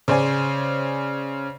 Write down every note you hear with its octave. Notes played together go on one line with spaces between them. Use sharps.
C#3 C5 D5 G#5